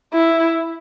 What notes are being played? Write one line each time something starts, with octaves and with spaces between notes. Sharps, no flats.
E4